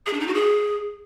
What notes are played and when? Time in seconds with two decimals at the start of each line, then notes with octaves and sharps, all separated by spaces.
0.06 G#4
0.13 D4
0.20 D#4
0.27 F#4
0.34 G#4